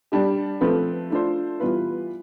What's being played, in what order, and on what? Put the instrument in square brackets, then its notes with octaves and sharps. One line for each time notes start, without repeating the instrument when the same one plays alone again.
[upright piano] G3 D4 G4
F3 A3 C4 F4 B4
A3 D4 F4 A4 C5
E3 G3 B3 F4 B4